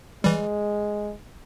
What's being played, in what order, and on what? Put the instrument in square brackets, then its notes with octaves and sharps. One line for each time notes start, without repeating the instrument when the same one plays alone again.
[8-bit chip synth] E3 G3 [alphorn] G#3